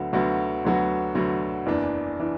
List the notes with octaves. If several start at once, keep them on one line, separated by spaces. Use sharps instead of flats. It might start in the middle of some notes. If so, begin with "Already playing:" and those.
Already playing: D2 D3 F#3 B3 F#4
D2 D3 F#3 B3 F#4
D2 D3 F#3 B3 F#4
D2 D3 F#3 B3 F#4
F#1 E2 E3 D4
E3 D4